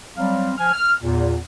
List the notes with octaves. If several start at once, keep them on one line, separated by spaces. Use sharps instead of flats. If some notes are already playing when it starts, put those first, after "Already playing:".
F#3 G3 C4 F5
F3 G#5 F6
F6
E2 A#2